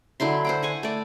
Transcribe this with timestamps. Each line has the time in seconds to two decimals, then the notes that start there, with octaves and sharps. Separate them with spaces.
0.20 D3 F#3 E4 C6
0.45 C5 F#5 G5
0.62 F#5 G#5 C#6
0.83 A3 D5